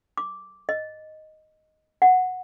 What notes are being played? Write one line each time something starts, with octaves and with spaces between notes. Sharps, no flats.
D6
D#5
F#5